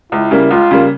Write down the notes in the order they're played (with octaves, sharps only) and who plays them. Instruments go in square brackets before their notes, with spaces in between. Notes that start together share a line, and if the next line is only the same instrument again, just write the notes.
[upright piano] C#2 [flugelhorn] E4
[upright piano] C#3 G3 A#3
[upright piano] C#2 [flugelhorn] F4
[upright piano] C#3 G3 A#3